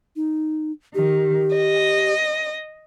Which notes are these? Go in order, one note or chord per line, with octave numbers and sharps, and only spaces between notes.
D#4
D#3 G4
D#5